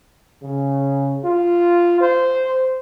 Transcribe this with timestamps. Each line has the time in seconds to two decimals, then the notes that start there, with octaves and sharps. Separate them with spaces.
0.42 C#3
1.24 F4
2.01 C5